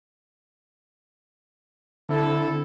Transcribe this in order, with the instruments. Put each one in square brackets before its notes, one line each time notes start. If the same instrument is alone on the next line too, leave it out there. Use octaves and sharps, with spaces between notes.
[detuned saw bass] D3 [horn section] C4 E4 A4